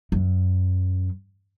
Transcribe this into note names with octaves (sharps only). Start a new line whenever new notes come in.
F#2